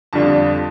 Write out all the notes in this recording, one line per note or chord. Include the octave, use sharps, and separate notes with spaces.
F2 D3 G3 D4 F4 A5